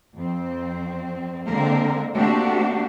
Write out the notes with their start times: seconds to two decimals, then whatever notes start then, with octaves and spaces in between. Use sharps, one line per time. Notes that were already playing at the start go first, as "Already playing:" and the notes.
0.15 F2 C4
1.50 D3 G#3 A#3 C4 A#4
2.17 A3 A#3 C4 D4 F#4 G4